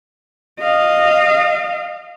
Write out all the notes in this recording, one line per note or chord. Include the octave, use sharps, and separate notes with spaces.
D#5 F5